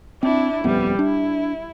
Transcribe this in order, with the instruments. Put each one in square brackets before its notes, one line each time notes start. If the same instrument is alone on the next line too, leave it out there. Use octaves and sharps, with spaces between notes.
[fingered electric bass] C4 [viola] D4 E4
[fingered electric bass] D#1 F2 B3 [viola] G3 B4
[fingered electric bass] D4 [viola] E4